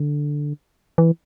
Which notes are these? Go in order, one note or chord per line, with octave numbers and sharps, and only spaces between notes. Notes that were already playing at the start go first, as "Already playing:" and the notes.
Already playing: D3
E3